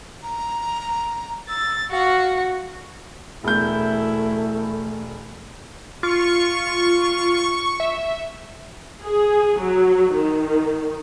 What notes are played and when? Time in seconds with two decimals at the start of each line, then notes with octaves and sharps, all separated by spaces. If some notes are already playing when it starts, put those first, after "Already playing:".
0.23 A#5
1.49 E6 A6
1.91 F#4 F5 F#5
3.44 E1 A3 E4 G6
6.03 F4 C#6
7.80 E5
9.03 G#4
9.60 F#3
10.15 D#3